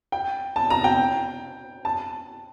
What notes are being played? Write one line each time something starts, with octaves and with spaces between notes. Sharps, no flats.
G5
A5
A#5
G5
A5